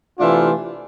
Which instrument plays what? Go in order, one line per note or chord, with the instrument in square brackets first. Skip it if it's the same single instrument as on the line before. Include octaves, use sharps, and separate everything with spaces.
[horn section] C3 E3 A3 D4 F4